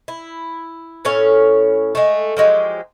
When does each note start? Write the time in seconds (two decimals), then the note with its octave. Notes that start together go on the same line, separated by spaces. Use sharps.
0.08 E4
1.05 A2 C#4 C#5 F5
1.95 G#3 A3
2.37 F3 F#3 G#3 G4